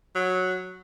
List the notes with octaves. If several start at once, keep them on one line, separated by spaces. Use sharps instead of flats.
F#3